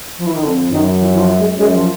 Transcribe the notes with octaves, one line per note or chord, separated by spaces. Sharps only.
F3
E3
D#3
F2 D3
F#2 D#3
E3
E3
F3
G#3
F#2 G#3
F3